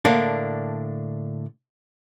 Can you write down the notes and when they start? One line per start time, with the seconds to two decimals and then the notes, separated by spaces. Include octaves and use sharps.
0.05 A2 D3 A#3 D4